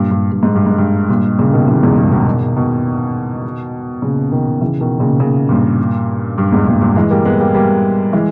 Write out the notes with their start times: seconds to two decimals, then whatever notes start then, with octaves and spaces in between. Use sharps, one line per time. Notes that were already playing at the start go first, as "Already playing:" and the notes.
Already playing: G2 A#2
0.11 G2
0.32 G2
0.43 G#2
0.55 G2
0.66 G#2
0.78 G2
1.09 G2 A#2
1.39 A#2 C#3
1.53 B2 D#3
1.68 C#3 E3
1.83 E2 G#2
1.98 G2
2.12 B2 D#3
2.26 B2 D#3
2.56 B2 D#3
4.02 A#2 C#3
4.32 B2 D#3
4.61 C#3 E3
4.81 B2 D#3
5.00 A#2 C#3
5.20 A#2 C#3
5.49 G2 A#2
6.38 G2
6.52 E2 G#2
6.67 G2 A#2
6.81 G2 A#2
6.96 E3 G#3
7.10 G3 A#3
7.25 G#3 B3
7.40 G3 A#3
7.55 G3 A#3
8.13 E3 G#3